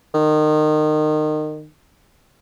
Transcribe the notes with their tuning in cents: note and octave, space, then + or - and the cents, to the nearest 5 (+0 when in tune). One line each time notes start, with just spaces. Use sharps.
D#3 -25